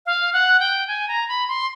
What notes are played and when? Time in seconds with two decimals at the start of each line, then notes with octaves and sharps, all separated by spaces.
0.06 F5
0.33 F#5
0.60 G5
0.88 G#5
1.08 A#5
1.29 B5
1.48 C6